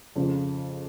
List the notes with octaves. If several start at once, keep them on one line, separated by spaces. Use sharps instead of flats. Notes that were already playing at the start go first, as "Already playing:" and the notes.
F2 C#3 F3